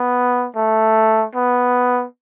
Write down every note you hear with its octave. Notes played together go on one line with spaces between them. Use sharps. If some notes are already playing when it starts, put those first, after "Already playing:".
Already playing: B3
A3
B3